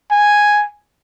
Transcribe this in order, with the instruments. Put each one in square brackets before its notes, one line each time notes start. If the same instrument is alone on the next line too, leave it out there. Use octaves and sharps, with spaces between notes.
[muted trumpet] G#5